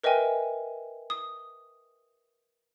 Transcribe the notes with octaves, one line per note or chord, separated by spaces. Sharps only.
A#4 B4 D#5 E5 G5 G#5
D#6